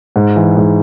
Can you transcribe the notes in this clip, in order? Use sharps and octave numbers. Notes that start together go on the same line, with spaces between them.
G#2
E3
G#2